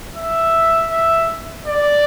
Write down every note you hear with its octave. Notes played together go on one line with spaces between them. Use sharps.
E5
E5
D5